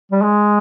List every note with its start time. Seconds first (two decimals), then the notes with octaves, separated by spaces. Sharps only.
0.12 G3
0.22 G#3